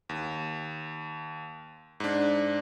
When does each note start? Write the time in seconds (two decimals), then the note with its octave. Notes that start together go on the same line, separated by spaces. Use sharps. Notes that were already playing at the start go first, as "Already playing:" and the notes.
0.09 D#2
2.00 G#2 D4